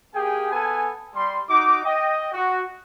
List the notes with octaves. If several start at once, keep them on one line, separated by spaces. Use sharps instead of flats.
A#3 G4 G#4 G5 G#5
B3 A4 G#5
G3 C6
D#4 F#4 D6
D#5 G5
F#4